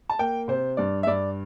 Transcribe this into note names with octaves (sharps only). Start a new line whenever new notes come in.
A5
A#3 G5
C3 C5
G2 D5
E5
G2 D5